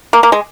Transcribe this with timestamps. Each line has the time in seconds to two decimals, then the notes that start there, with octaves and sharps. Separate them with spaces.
0.13 A#3
0.23 A#3
0.32 G#3